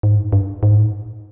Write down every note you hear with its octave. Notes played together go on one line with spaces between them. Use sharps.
G#2
G2
G2
G#2
A2